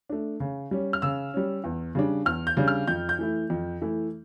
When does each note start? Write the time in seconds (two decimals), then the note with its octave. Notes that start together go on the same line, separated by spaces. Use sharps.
0.09 A3 D4
0.40 C#3
0.71 G3 C#4
0.93 F6
1.02 C#3 E6
1.34 G3 C#4
1.64 E2
1.95 C#3 G3 D4
2.26 E2 F6
2.47 G6
2.57 C#3 G3 D4
2.68 F6
2.87 F2 G6
3.09 G6
3.19 E3 A3 E4
3.50 F2
3.81 E3 A3 E4